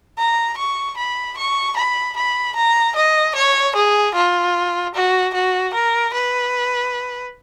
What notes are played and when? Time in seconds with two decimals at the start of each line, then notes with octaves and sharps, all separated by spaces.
0.19 A#5
0.58 C#6
0.97 B5
1.38 C#6
1.77 B5
2.17 B5
2.56 A#5
2.96 D#5
3.36 C#5
3.76 G#4
4.15 F4
4.95 F#4
5.34 F#4
5.74 A#4
6.14 B4